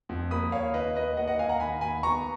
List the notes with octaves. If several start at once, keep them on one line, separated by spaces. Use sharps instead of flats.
F2
A#3 B5 D#6
D#2 C#5 F5
D#3 B4 D#5
D#2 B4 D#5
A#3 D#5 F#5
D#5 F#5
D#2 F5 G#5
F#5 A#5
D#3 G#5 B5
D#2 G#5 B5
B3 A#5 C#6